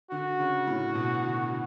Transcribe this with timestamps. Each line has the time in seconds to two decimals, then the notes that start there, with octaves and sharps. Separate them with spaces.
0.11 D3 F#4
0.40 C#3
0.67 A2
0.95 B2
1.23 D3
1.50 D3